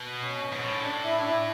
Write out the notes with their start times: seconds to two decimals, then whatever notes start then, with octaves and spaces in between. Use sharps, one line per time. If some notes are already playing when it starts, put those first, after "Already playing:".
Already playing: B2
0.23 C#4
0.53 G#2
0.62 A2 C#4
0.83 D4
1.03 E4
1.18 D4
1.24 E4